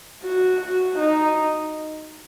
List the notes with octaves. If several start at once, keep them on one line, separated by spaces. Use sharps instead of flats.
F#4
F#4
D#4